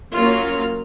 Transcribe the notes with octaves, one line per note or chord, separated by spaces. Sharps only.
F#3 A#3 C#4 F4